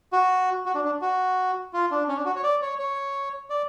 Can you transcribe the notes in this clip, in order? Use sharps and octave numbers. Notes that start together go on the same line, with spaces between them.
F#4
F#4
D4
D4
F#4
F4
D4
C#4
D4
F#4
C#5
D5
C#5
C#5
D5